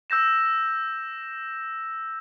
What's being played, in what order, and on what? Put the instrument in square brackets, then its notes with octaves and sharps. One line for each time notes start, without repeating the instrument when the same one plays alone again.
[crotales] E6 G6 A#6 E7